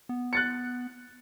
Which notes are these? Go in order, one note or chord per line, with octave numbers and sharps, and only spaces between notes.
B3
F#6 A6 C#7